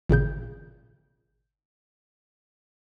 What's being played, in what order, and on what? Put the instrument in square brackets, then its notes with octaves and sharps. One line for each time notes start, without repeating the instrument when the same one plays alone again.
[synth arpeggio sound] G#1 A#2 C#3 G6